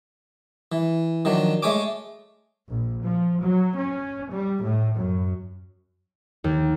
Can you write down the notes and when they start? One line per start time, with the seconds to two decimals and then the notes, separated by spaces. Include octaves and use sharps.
0.72 E3
1.25 D#3 F3 F#3 D4
1.63 G#3 A3 C#5 G#5 D6
2.69 A#1
3.05 F3
3.42 F#3
3.77 C#4
4.32 G3
4.65 A2
4.98 F#2
6.44 D#2